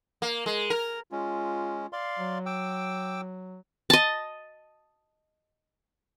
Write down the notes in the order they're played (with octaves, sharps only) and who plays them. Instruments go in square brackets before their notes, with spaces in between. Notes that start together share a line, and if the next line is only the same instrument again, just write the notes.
[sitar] A#3
G#3
A#4
[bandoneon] G#3 C#4 [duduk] F4
[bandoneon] D5 F5 C6
[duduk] F#3
[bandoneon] G5 D6 E6
[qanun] D#5 A5